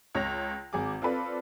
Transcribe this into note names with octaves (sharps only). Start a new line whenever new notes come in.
C#2 C#5 A#6 F7
G#1 G#4 D6
C4 F4 A4 B4 D5